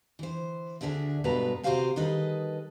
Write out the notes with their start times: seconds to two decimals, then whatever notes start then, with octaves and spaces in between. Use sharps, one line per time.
0.19 E3 C5
0.81 D2 D3 D4 G#4 E5
1.24 G2 B2 G#3 A4 B4 A#5
1.63 C3 F#4 G4 C5 F5 G#5
1.96 D#3 G3 G#4 A4 B4 D#5